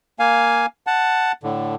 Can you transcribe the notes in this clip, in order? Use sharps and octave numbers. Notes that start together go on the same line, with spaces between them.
A#3 F5 G#5
F#5 A5
A2 D3